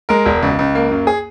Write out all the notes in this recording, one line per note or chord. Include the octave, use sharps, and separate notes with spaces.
G#3 A#4
E1
C#2
C#2
A#3
F#2
G#4